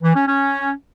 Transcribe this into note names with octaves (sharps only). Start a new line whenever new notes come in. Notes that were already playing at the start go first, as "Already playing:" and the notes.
E3
C#4
C#4